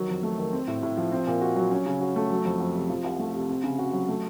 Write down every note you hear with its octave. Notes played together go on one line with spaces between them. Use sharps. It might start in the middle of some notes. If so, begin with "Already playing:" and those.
Already playing: D#3 F#3
F2
A3
D#3
C4
A2
A2
F3
C4
A#2
F#4
F#3
C#4
C#3
F#4
A3
F#3
F2
F2
C3
F3
C2
A3
C3
C4
C#3
F#4
F#3
A3